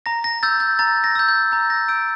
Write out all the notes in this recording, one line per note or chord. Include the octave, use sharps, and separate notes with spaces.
A#5 A#6
A#6
E6 G6 A6
G6
A#5 A6
A#6
E6 G6
G6
A#5 A6
A#6
E6 G6 D7